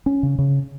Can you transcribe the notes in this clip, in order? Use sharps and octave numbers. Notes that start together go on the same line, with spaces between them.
C#4
C#3
C#3